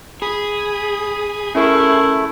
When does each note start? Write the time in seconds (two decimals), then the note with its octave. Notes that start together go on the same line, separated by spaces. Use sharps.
0.22 G#4 B5 D#6
1.55 A3 C#4 E4 A#4 C#6